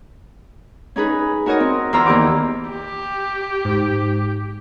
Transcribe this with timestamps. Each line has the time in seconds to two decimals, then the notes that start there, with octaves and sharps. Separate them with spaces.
0.96 C#4 D#4 G#4 B4
1.46 D#4 F#4 A#4 C#5 D#5
1.60 C4
1.93 E2 E3 F4 C5 A#5 E6
2.06 D#2 D#3 G4 D6
2.71 G4
3.65 G#2